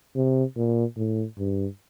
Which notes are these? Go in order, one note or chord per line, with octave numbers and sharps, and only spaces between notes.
C3
A#2
A2
G2